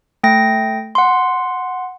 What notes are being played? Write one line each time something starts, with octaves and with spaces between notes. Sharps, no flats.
A3 G5 A#6
F#5 C6